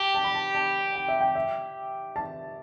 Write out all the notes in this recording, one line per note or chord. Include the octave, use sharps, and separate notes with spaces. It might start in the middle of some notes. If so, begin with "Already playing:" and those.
Already playing: G4 A5
A5
B5
A5
A5
G5
E5
G5
E5
A5